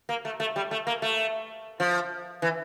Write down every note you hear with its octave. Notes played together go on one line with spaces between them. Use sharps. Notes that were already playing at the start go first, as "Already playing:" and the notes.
A#3
A3
A3
G3
A3
A#3
A3
F3
E3